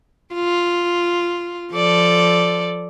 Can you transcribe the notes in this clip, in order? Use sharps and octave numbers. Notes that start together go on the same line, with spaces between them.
F4
F3 A4 D5